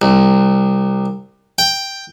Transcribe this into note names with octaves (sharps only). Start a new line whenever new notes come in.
C2
G5